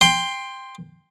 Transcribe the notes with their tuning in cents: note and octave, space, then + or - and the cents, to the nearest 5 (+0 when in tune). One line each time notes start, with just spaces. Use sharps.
G5 +20 C6 +0